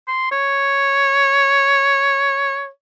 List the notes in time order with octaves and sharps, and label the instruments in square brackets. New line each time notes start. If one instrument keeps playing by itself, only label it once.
[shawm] C6
C#5